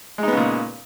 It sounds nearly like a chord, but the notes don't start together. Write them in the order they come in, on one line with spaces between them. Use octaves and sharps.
G#3 D#4 B3 C#3 A#2